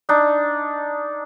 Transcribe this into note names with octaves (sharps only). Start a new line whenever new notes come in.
D4 D#4